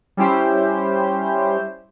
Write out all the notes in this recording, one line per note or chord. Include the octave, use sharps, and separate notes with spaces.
G3 C#4 E4 G4 C5